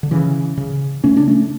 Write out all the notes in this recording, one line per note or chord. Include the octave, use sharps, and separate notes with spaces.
D3
C#3 E3
C#3
C#3 A3 C#4
D4
A3 C#4